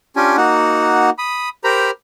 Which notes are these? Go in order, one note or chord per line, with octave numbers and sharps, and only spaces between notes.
C#4 D4 F4 G4 G#5
A#3 D#4 F#4 F#5
B5 D#6
G4 A#4 C5 A#5 B5